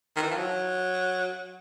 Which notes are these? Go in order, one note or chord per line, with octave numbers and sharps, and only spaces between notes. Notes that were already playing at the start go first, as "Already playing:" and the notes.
D#3
E3
F3
F#3